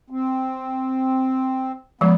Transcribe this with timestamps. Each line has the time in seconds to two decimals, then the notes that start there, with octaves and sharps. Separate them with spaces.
0.10 C4
2.01 F3 G#3 B3